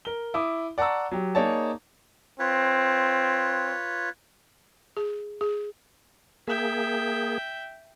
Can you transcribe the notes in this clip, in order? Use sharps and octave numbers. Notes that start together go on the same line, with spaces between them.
A#4 G7
E4 D6 D#6
D5 F#5 A5 A#5 C#6 E6
F#3 G4
A#3 D#4 G#4 C#5 D5 A5
C4 F4 B4 C#5
G#4
G#4
A#3 G#4 E5 G5